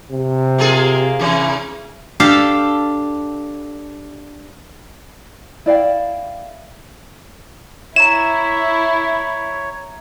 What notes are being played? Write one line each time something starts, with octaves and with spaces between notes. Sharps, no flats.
C3
A#3 F4 G#4
C3 E3
D4 G4 A4 F5 A5
E4 D5 F5 G5
E4 C#5 E5 A#5 E7